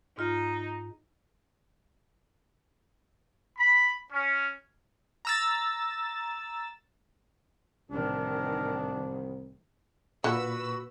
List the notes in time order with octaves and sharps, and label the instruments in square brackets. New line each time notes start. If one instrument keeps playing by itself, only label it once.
[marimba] G#2 F4 [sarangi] D#4
[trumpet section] B5
C#4
[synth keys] A#5 E6 A6
[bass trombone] C2 [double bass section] A2 D#3 E3 [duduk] D4 [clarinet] A#4
[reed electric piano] A#2 A#3 C#6 [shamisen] D3 [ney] F#4 [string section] B4 B5 E6